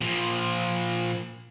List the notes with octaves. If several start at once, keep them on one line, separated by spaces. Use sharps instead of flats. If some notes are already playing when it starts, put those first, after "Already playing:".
A#2 F3